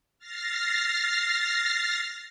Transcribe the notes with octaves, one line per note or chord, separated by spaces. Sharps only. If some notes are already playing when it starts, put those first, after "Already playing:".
F6 A6 A#6 C7